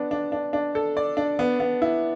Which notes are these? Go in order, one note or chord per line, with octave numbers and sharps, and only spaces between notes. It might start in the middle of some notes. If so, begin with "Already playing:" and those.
Already playing: B3 D4
D4
D4
D4
A4
D5
D4
B3
B3
E4